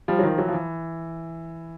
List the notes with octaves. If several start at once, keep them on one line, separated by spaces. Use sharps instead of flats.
F3 G3
F#3
D#3 F3
E3 F#3
F3
E3